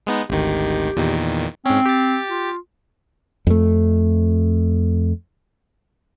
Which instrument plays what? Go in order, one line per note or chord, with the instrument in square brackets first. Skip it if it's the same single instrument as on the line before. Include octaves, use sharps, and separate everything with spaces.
[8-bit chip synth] G#3 B3 D#4
[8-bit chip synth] G#1 D2 D#3 [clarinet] G4
[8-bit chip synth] E2 A#2 D#3
[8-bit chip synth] G#2 C#4 [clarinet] C4
[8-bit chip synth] G4 A6
[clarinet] F4
[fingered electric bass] F2 A3